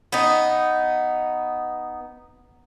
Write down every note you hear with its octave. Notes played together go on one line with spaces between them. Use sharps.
B3 D#4